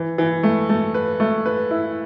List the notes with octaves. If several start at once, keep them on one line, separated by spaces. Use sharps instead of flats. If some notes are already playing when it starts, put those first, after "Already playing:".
Already playing: E3
E3
A3
A3
B4
A3
B4
E4